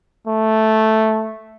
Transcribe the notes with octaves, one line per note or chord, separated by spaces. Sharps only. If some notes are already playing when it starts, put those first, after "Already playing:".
A3